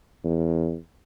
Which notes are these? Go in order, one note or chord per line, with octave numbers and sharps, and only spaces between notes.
E2